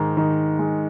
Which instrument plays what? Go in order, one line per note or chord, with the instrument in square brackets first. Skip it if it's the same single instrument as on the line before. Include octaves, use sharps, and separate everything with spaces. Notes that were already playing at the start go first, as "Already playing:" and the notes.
Already playing: [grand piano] G#2 D#3
D#3
G#3